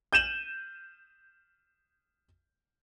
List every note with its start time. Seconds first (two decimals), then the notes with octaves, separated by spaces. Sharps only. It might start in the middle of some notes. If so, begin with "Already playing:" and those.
0.13 G6 D#7 E7 F#7